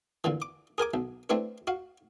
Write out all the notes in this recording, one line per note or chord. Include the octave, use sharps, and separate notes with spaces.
A#2 D3 E3
D6
G#4 A#4 G#5 D6
B1
A3 C4 D4 E4 B4
F#4 F5